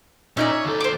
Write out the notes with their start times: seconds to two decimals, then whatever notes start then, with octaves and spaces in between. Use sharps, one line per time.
0.37 A#2 C#4 D#4 D5 E5
0.51 C#5
0.65 D#2 A4
0.81 C5 D6